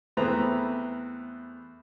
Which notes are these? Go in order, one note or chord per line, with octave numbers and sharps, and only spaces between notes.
E2 A3 C4 B4 A#5